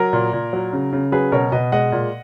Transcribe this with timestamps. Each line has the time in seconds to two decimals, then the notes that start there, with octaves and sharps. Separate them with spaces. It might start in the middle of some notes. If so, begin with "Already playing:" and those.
Already playing: F#3 A#4
0.13 A#2
0.33 A#2
0.53 F#3
0.73 C#3
0.93 C#3
1.12 F#3 G#4 B4
1.32 B2 A#4 C#5
1.52 B2 B4 D#5
1.72 G#3 D#5 F#5
1.92 A#2